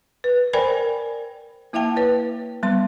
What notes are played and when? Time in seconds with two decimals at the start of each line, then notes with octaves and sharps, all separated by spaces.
0.24 B4
0.53 A#4 C5 D5 G5 G#5 B5
1.73 A#3 E4 E5 F5 G5 A5
1.97 B4 C#5
2.63 G3 B3 C6